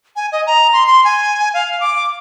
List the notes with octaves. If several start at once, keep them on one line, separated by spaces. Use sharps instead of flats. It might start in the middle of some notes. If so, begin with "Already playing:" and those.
G#5
D#5
A#5
C6
C6
G#5
F5
D6